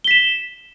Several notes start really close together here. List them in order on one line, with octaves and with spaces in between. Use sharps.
G7 B6 E7